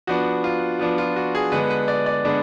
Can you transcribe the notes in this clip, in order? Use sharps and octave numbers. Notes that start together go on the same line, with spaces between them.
F3 B3 D4 F#4
F4
F3 B3 D4 F4
F4
F#4
G#4
D3 G#3 B3 D4 B4
B4
D5
D5
D3 G#3 B3 D4